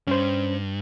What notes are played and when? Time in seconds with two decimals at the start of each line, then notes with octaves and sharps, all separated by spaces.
0.07 G2 C#4 C5